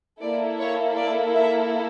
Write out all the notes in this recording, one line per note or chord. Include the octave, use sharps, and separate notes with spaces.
A#3 E4 A4 D5
C#5
D5
E5